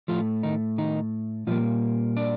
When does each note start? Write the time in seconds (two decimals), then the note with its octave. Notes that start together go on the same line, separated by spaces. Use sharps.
0.08 A2 F3 A3 F4
0.43 D#3 D#4
0.78 D#3 D#4
1.47 A#2 F3 G3 A#3 F4
2.17 D4 D5